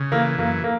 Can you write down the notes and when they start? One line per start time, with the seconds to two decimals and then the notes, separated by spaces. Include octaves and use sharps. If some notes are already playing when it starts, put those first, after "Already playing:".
Already playing: C#3
0.12 E3 A#3
0.38 F#2 A#3
0.64 A#3